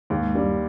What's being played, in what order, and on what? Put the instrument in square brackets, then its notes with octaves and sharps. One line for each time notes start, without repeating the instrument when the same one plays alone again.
[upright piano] D#2 [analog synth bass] G#2
[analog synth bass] G2 [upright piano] G3